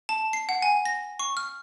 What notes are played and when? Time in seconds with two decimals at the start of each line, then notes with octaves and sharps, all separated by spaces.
0.09 A5
0.33 C7
0.49 F#5
0.62 G#5
0.85 A#6
1.19 C#6
1.37 F6